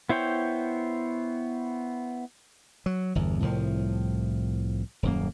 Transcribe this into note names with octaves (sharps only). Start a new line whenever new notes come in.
B3 E4 C5 C#5 G5
F#3
G1 E2
C2 A2 F3
D#1 F#2 A#3